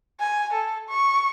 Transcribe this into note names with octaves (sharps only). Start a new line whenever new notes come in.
G#5
A4
C#6